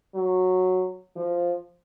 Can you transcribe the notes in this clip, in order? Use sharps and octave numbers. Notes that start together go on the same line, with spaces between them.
F#3
F3